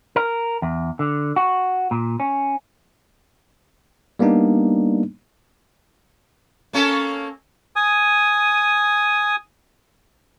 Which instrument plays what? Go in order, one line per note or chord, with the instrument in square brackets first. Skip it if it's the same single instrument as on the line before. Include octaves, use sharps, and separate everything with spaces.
[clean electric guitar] A#4
E2
D3
F#4
A#2
C#4
[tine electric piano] G3 A#3 B3 D4 D#4
[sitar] A#3 C#4 A4
[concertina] G#5 D#6